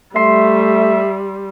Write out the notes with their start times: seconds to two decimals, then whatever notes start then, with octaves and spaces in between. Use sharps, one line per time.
0.16 G3 A3 E5 C6